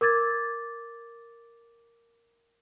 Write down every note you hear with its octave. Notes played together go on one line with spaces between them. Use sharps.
A#4 D6 G#6 A6